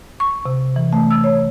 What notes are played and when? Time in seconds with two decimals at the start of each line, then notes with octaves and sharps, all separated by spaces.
0.20 C#6
0.46 C3
0.76 E3
0.93 A3
1.11 E6
1.24 C#5